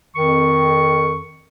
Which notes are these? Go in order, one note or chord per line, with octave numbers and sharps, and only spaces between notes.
F2 D#3 C#6